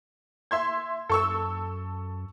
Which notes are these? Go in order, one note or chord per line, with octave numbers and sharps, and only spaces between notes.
E5 C6 G#6
F#2 A4 C#6 E6